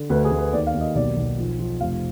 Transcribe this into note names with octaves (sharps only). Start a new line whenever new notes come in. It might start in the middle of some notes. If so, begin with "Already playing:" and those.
Already playing: D3
D2 B4
G#4
D2
B4
D#2 D5
F5
D#2
D#5
B1 D5
B1
F3
F3
F1 F5